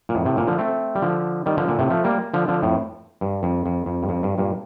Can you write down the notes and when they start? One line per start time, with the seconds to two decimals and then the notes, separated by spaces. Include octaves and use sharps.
0.09 A#2
0.15 F2 A2
0.26 A2 C3
0.37 A#2 D3
0.47 D3 F3
0.58 A3 C4
0.95 G3
1.02 D3 F3
1.46 D#3 G3
1.57 D3 F3
1.68 A#2 D3
1.79 A2 C3
1.90 F3 A3
2.04 G3 A#3
2.34 D3 F3
2.48 D3 F3
2.63 F2 A2
3.21 G2
3.43 F2
3.66 F2
3.86 F2
4.03 G2
4.09 F2
4.23 G2
4.38 G2 A#2